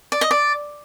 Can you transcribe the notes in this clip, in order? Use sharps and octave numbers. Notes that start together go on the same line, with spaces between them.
D5
D#5
D5